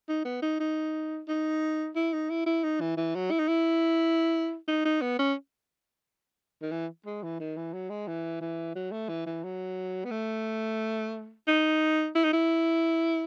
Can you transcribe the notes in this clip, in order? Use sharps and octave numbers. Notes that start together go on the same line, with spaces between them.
D#4
B3
D#4
D#4
D#4
E4
D#4
E4
E4
D#4
E3
E3
F#3
E4
D#4
E4
D#4
D#4
B3
C#4
D#3
E3
G#3
E3
D#3
E3
F#3
G#3
E3
E3
F#3
A3
E3
E3
F#3
B3
A3
D#4
E4
D#4
E4